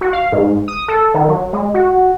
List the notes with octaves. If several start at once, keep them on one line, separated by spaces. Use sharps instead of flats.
F#4
F5
G#2
D#6
A4
D#3
F#3
G#3
F#4